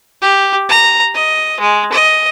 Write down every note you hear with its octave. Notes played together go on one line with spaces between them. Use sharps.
G4
A#5
D#5
G#3
D#5